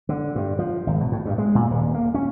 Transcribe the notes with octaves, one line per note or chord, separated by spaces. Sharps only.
D3
G2
F3
G#1
B2
A2
G2
G#3
A#2
D#1
A#3
C#4